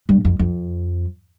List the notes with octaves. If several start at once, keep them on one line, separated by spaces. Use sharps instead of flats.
G2
F2
F2